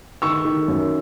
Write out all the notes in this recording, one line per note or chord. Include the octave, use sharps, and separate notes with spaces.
D#3 C#6 E6
D#3
F#2